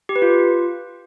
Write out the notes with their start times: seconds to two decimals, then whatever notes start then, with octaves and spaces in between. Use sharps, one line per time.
0.09 G4
0.16 B4
0.22 F4